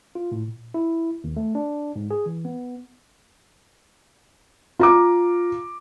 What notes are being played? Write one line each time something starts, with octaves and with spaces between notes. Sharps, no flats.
F4
A2
A#2
E4
D#2
A3
D4
G#2
G#4
E3
B3
F4 A#5 D6